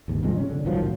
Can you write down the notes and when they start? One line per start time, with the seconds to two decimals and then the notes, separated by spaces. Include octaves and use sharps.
0.08 G#1 D#2
0.23 G2 C3 F3 G#3
0.37 C#4
0.50 D3
0.65 C2 D#3 F3 F#3
0.82 A2